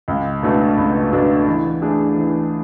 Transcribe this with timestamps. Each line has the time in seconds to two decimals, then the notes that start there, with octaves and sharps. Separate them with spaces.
0.08 C#2
0.43 B2 A3 D4 A4
0.78 C#2
1.13 B2 A3 D4 A4
1.47 E3
1.82 A3 D4 G#4
2.16 E3